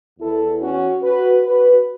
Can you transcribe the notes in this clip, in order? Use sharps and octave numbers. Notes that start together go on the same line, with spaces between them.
E2 E3 E4 A4
C#4 F#4
F#4 B4
F#4 B4